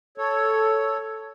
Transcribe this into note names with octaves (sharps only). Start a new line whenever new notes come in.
A4 C#5